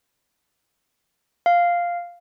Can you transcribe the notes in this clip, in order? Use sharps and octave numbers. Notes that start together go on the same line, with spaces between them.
F5